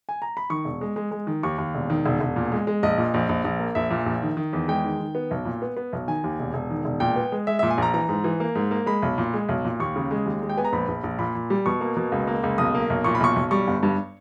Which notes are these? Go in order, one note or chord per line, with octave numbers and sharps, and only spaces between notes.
G#5
A#5
B5
D#3 C#6
E1
G#3
G#3
G#3
D#3
D#2 C#6
D#2
E1
D#3
E1
E1
A#2
G#3
G#3
A#1 D#5
A#2
A#1
A#1
A#1
A#3
A#1 E5
A#2
A#1
D#3
D#3
E2
G#3 G5
D#3
D#3
B3
B1
A#2
B3
B3
B1
D#3 G#5
D#2
E1
E1
D#3
E1
A#2 G5
B3
G#3
G#3 E5
E5
A#2
G#5
A#1 A#5
E3 A#5
G#2
E3
A#3
G#2
A#3
G#3 B5
B1
A#2
G#3
B1
A#2
D#2 C#6
C#3
G#3
D#2
G#3
G5
B3 G#5
A#5
A#1 B5
A#1
A#1
A#2 B5
A#2
G3
B2 C#6
A#3
B2
C#2
A#3
C#2
B1 D#6
A#3
B1
A#2 C#6
B5
B1 C#6
B1
G3 C#6
G1
G2